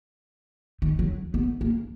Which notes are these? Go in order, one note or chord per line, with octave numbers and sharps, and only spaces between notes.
D#3
F#3
B3
A#3